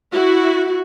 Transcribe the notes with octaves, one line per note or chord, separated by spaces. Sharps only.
E4 F#4